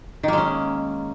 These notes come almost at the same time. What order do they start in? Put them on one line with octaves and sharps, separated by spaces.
D#3 A#3 G#3 C#4